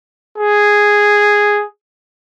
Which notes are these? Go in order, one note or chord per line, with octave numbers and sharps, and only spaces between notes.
G#4